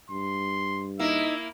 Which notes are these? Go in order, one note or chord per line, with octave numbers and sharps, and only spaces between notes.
G2 C6
A#3 D#4 E4 E5